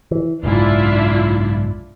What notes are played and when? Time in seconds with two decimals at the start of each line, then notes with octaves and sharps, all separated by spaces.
0.11 E3
0.43 F#1 B1 G#2 D4 E4 F4